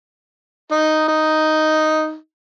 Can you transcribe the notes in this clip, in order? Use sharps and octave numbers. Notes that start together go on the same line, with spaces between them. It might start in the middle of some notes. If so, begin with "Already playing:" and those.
D#4
D#4